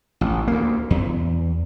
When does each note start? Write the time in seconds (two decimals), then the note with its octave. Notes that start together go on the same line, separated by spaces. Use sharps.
0.21 A1
0.48 D2 A#3
0.90 E2